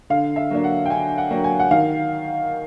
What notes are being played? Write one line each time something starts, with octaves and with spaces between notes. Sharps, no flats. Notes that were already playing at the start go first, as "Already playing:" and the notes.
D3 F5
E5
F#3 A#3 D4
F#5
G5
D3 G#5
F#5
F#3 A#3 D4
G#5
F#5
D#3 F5